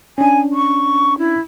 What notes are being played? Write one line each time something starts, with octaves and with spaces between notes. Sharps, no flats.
C#4 D4 G#5
C#6
E4